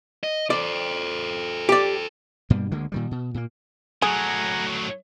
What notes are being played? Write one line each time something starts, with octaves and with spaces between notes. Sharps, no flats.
D#5
A4 C5 D5
G4 D5
G2 B2 G3 A#3
D2 D3 G#3 A#3
A#2 D#3 G3
B2
A#2 A#3
A2 F#3 G#4 F#5 G#5 A#5